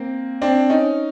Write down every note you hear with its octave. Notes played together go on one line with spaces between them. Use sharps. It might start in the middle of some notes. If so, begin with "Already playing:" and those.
Already playing: A#3 C4
C4 D4
C#4 D#4